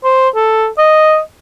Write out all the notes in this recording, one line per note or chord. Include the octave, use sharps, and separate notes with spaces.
C5
A4
D#5